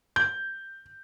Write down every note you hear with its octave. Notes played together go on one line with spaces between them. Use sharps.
G6